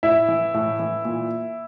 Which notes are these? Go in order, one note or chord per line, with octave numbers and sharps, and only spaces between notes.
A2 E4 E5
E3
A2
E3
A#2